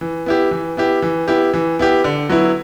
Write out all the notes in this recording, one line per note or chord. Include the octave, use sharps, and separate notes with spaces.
E3
B3 E4 G4
E3
B3 E4 G4
E3
B3 E4 G4
E3
B3 E4 G4
D3
F#3 B3 E4